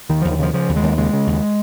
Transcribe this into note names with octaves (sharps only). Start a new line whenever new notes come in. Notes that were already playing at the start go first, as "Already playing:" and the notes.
D#2 D#3
D#2 F3
D#3
C#3 F3
C#3 F3
D#2
G#3
D#2
C#3 G#3
C#3
D#2